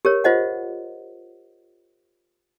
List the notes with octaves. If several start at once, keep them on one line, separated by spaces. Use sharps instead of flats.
G4 A#4 C#5
F4 C5 D#5 F#5